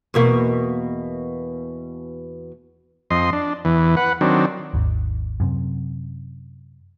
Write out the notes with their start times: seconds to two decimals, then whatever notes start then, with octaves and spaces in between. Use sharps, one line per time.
0.14 E2 B2 A#3
3.11 F2 D#5 C6
3.33 D4
3.65 E2 E3
3.97 B4 F#5
4.21 D#3 F#3 C4 D4
4.74 G#1 D#2
5.40 F#2 C3